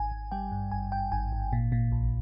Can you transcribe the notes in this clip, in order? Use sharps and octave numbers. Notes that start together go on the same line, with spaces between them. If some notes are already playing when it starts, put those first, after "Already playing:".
Already playing: G#1 G#5
G#1
G3 G5
G2
G#1 G#5
G#1 G5
G#1 G#5
G#1
A#2
A#2
A#1